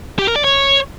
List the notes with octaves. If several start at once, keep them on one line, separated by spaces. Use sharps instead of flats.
G4
A#4
D5
C#5